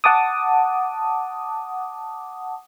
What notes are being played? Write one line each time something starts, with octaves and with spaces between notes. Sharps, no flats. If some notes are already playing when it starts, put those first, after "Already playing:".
F#5 A5 D6 D#6